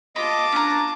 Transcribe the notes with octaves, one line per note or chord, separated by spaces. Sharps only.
F4 D#5 A5 B5 D6
C#4 D4 A#5